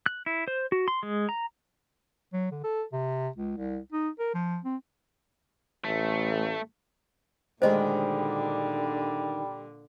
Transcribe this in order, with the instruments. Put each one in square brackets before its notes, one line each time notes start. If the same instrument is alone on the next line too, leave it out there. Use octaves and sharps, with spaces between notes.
[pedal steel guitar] F#6
E4
C5
F#4
C6
G#3
A#5
[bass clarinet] F#3
D3
A4
C3
C#2
C2
D#4
A#4
F3
C4
[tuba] A1 [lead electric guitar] A3
[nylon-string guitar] D2 D#3 G#3 [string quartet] A#2 D3 [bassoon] G3 [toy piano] C5 D#5